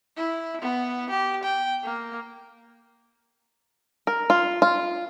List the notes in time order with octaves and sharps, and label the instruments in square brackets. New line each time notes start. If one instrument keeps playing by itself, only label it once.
[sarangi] E4
B3
G4
G5
A#3
[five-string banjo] A#4
F4
F4